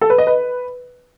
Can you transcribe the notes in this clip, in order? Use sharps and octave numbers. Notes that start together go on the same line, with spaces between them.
A4
B4
D#5
B4